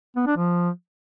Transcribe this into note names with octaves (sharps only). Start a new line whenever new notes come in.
B3
D4
F3